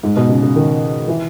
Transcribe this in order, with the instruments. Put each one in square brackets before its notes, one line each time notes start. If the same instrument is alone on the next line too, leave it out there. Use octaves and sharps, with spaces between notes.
[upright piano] G#2
B2
C#3
C#3
D#3
E3